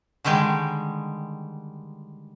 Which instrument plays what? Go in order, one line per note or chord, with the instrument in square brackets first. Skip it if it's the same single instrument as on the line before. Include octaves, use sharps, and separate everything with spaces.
[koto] D3 D#3 G3 G#3 G4